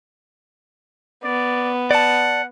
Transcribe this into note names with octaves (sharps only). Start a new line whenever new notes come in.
B3 D5
D5 F#5 A5